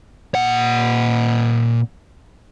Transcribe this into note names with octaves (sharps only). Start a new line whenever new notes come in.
A#2 F#5